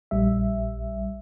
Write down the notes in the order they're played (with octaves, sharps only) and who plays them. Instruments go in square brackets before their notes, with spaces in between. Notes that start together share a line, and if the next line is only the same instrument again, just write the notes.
[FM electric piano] A#1 G3 E5